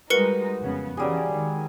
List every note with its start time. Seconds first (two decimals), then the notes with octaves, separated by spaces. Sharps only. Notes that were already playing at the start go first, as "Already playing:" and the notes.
0.10 G3 G#3 D#4 F#4 A#4 B4 C#7
0.59 F2 C#3 B3
0.97 C#3 E3 F#3 G3 G#4
1.31 D#3 G#3